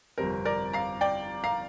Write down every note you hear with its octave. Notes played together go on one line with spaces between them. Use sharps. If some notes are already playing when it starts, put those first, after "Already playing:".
G1 F2 C3 G3 C4 A#4
A#4 D5
F5 A#5
D5 G5
F5 A#5